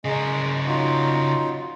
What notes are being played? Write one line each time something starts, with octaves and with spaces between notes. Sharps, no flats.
C#3 G#3 G#4 A#4
F#3 D#4 F4